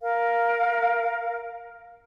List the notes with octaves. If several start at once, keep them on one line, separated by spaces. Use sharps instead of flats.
A#4 F5